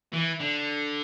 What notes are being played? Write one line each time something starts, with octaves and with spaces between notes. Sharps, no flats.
E3
D3